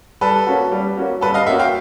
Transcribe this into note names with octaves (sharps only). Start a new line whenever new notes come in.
G3 A4 B4
A#3 C#4 F#4
G3
A#3 C#4 F#4
G3 A4 B4
D#5 F5
A#3 C#4 F#4 E5 F#5
F5 G5